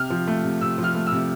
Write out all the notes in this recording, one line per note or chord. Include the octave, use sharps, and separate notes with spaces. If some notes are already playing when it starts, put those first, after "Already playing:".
Already playing: C3 F6
F3
A3
C3
C3 E6
F3
F6
A3
E6
C3